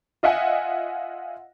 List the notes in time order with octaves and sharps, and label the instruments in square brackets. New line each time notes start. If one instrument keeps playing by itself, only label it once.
[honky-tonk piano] F4 D#5 E5 F#5 G#5